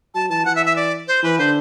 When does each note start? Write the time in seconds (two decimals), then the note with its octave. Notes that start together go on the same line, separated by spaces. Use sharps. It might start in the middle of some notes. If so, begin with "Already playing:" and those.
0.14 F#3 A5
0.30 E3 A5
0.45 E3 F#5
0.55 E5
0.66 E5
0.76 D5
1.08 C5
1.23 E3 B4
1.39 D3 C5